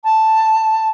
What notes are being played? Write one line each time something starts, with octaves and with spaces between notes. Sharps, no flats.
A5